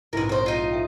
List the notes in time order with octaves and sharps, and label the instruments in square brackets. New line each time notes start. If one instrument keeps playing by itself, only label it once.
[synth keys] A#1 G#2 C3 [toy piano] E4 G#4 [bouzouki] A#4 B4
[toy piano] G4 A4 C#5 [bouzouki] A#4 C5
[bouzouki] D#4 F4
[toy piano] A4 E5 G5